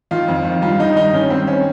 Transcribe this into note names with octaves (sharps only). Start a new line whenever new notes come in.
D#3 F4
F2
D#3
G2 F4
D#3 D#4
G2 D#4
D#3 C#4
G2 C4
D#3 C#4